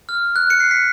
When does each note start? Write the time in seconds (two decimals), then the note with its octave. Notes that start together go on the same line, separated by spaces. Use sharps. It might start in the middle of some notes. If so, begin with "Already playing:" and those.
0.09 F6
0.36 F#6
0.50 C#7
0.60 C7
0.71 B6